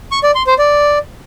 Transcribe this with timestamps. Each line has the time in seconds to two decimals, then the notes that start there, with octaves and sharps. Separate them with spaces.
0.12 C#6
0.23 D5
0.35 C6
0.47 C5
0.59 D5